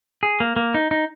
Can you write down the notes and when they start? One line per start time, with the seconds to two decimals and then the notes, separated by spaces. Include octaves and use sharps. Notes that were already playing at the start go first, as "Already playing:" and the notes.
0.23 G#4
0.40 A#3
0.56 A#3
0.74 D#4
0.91 D#4